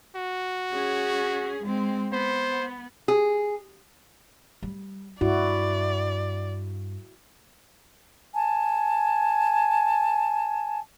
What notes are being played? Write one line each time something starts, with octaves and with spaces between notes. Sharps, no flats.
F#4
C#4 G#4
G#3 C4
B3 C5
G#4
G3
G2 E4 F#4 D5
G#5 A5